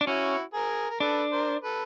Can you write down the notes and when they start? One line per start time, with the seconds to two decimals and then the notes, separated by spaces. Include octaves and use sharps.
0.01 D4
0.07 C#4 E4 F#4
0.54 G#4 A#4
0.90 A#4
1.00 D4 A4 B4
1.32 A#4 C5
1.64 A4 B4